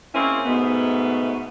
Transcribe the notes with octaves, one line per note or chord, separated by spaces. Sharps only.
G#3 A#3 C4 C#4 E4
G#2 B2 A3 B3